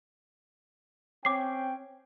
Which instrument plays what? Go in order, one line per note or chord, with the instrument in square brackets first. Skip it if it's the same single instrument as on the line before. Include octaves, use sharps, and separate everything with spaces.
[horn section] C4 C#4 G5 [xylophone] D6 C7